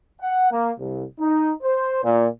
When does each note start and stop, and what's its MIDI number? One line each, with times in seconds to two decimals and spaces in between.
0.21 0.48 78
0.51 0.71 58
0.79 1.04 36
1.20 1.53 63
1.62 2.02 72
2.04 2.27 46